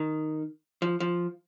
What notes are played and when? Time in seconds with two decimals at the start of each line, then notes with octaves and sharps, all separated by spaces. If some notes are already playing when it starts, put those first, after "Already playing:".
Already playing: D#3
0.82 F3
1.00 F3